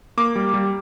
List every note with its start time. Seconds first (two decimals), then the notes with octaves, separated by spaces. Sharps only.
0.17 A#3 D6
0.35 G3
0.54 G3